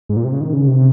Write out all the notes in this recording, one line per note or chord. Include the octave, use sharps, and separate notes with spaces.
G#2
A#2
C3
C#3
D#3
C#3
C3